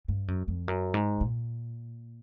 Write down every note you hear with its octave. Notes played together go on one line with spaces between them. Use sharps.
G2
F#2
F2
F#2
G#2
A#2